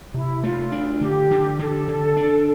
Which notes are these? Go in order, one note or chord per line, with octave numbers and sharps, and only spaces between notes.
C3 E4
A3 F4
D4
D3 G4
D3
D3 A4
D3
D4